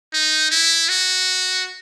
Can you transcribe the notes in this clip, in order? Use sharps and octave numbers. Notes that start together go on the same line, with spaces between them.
D#4
E4
F#4